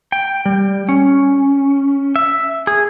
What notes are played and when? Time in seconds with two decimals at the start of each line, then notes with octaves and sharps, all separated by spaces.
0.12 G5
0.46 G3
0.89 C#4
2.16 E5
2.67 G#4